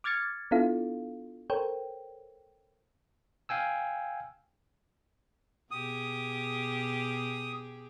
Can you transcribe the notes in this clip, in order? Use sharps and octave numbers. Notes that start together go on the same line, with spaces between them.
D6 F6 G#6 A6 C#7
B3 D4 E4 F4 A4 F5
A4 A#4 C5 C#5 G5
F5 G5 G#5 E6
B2 G4 G#4 D#6